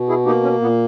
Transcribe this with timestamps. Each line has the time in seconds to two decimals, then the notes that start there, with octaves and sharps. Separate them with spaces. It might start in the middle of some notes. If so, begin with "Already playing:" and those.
Already playing: B2
0.09 E4 G#4
0.26 A#3 D#4 G4
0.43 C#4
0.60 A#2 B3